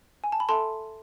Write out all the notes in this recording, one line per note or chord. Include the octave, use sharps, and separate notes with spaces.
G#5
A5
B5
A4 E5 A5 C6